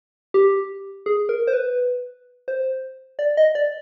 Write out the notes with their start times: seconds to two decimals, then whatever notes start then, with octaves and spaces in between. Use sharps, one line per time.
0.34 G4
1.06 G#4
1.29 A#4
1.47 C5
1.53 B4
2.48 C5
3.19 D5
3.37 D#5
3.55 D5